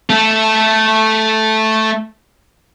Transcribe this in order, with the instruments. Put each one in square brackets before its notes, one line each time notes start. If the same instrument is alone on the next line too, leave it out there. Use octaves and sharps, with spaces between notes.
[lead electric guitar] A3 A4